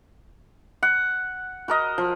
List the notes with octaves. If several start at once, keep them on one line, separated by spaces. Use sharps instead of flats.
F#5
F#4 A#4 D#5
F3